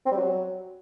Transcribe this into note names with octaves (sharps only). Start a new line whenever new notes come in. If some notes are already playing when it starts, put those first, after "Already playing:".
C4
G3
F#3